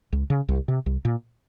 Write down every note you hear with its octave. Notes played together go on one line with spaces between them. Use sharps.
C#2
C#3
C2
C3
C2
A#2